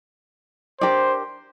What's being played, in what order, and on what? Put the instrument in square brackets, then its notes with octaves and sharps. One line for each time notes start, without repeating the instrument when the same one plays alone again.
[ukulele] D4 G4 A#4 D5 [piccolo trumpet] C5